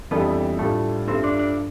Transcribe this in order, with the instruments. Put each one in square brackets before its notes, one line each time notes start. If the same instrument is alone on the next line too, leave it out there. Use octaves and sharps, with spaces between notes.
[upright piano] F2 E3 G3 D4 A4 [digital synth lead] B3
[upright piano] A2 G3 D4 F4 A4 [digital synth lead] A3
[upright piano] G2 F3 A3 [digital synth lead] C4
[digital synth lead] D4
D4